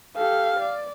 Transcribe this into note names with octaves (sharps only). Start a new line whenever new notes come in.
G4 A4 F5
D5